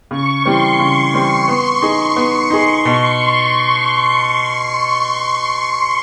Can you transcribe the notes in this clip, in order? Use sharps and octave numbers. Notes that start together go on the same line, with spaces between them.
C#3 C#6
E3 G3 C4 C6
C#3 C#6
E3 G3 C4
B3
D#4 G#4
B3
D#4 G#4
B2